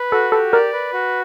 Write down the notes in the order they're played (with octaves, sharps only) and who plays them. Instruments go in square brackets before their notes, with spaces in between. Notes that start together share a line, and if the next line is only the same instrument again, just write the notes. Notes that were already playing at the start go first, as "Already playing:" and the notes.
Already playing: [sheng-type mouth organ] B4
[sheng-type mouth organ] F#4 [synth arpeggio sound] A4
[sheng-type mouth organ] G4 [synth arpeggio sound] A4
[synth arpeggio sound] A#4 [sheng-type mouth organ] D5
[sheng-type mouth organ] B4
F#4